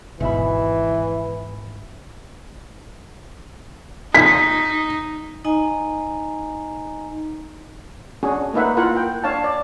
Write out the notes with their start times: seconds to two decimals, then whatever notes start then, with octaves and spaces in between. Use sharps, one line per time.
0.20 D1 G#1 G#2 B2 E3 E5 B5
4.14 D#4 B6
5.45 D#4 D#5 G#5 A#5
8.23 C#4 D4 F#4 G#4
8.53 A3 A#3 D#4 B4 E5 F#5
8.77 A#3 E4 F4 A#4 F#5
8.97 G5
9.24 D4 C#5 F5 A5
9.44 D5